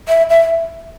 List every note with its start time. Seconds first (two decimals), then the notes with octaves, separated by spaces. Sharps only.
0.09 E5
0.30 E5